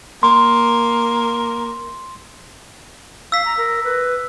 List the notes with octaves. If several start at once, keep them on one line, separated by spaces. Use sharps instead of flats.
A#3 C6
F5 E6 B6
A#5
A#4
B4